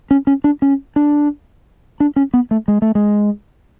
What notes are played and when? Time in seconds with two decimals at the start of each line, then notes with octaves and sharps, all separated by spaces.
0.11 C#4
0.27 C#4
0.44 D4
0.62 C#4
0.96 D4
2.00 D4
2.16 C#4
2.34 B3
2.51 A3
2.68 G#3
2.82 A3
2.95 G#3